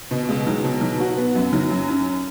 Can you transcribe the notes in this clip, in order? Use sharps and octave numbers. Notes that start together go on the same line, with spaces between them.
B2
C#2
F#3
B2
F#3
F#4
B3
F#2
F#3
F#2
C#4